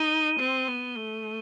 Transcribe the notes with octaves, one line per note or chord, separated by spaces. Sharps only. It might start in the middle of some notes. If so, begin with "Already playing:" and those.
Already playing: D#4 D#7 G7
C4
B3
A3